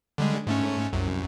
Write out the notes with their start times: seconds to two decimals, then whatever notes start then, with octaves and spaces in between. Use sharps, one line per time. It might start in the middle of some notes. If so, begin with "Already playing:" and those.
0.18 D3 G3 G#3
0.47 G#2 A3 C#4
0.93 C2 F#2